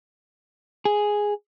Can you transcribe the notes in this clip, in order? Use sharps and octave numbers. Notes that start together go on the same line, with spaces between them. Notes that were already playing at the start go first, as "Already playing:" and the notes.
G#4